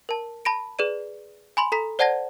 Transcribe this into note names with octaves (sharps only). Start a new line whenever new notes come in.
A#4 A5
A5 B5 A#6 D7
G#4 B4 D5 D#7
G#5 B5 C6 F#7
A4 A#5 B6
C5 D5 F#5 A5 G#6 A#6